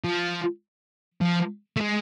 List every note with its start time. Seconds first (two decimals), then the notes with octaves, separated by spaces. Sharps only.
0.04 F3
1.21 F3
1.77 A3
1.81 G#3